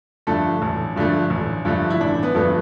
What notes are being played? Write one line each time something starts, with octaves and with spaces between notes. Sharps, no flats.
G2 D3 F3 A3 A4
A1
G2 D3 F3 A3
A1
G2 D3 F3 A3
E4
A1 D4
B3
G2 D3 F3 A3